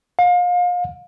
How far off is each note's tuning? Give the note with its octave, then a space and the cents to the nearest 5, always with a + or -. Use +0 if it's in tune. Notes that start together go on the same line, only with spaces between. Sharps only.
F5 +30